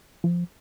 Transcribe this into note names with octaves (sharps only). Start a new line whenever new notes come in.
F3